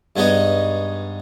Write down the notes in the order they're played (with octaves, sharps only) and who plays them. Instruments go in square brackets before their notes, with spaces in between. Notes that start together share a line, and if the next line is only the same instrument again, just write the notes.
[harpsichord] G2 G#3 B3 D#4 C#5 D#5